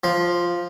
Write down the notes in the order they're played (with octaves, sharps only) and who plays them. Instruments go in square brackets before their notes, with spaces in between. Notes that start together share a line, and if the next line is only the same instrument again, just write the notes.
[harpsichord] F3